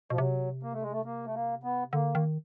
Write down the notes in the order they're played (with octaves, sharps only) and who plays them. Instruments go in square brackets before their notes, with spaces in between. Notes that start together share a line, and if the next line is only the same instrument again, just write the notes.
[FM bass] B2 [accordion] F3
[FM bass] C3 [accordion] F#3
[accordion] A#3
A3
G#3
A3
A#3
A3
A#3
B3
[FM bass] D3 [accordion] A#3
[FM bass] D#3